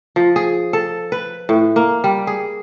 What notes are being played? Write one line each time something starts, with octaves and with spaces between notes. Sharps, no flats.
F3
G#4
A4
B4
A2
A#3
G3
G#4